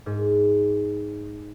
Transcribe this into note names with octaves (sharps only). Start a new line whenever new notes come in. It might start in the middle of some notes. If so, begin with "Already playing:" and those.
G#2